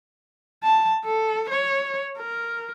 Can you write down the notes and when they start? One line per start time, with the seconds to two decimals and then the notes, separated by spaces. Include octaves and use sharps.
0.63 A5
1.05 A4
1.50 C#5
2.18 A#4